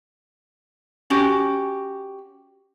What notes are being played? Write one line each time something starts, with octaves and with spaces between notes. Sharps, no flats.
C#4 F#4 G4